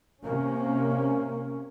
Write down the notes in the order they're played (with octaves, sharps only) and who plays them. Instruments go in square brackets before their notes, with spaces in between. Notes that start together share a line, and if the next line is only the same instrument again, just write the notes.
[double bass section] C3 A#3 C#4